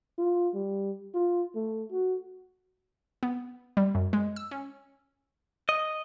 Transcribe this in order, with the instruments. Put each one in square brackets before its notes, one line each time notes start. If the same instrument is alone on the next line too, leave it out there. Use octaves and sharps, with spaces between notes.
[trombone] F4
G3
F4
A3
F#4
[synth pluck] B3
G3
F#2
G#3
E6
C#4
[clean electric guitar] D#5